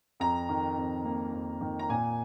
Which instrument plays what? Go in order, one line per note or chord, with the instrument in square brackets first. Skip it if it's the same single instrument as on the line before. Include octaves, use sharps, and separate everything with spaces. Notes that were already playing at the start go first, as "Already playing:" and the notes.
[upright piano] F2 A#5
D#3
F2
A#3
F2
D#3
A#5
A#2 G#5